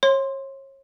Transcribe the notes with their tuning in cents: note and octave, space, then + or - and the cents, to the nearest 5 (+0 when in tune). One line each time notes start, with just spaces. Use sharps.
C#5 -35 C6 +0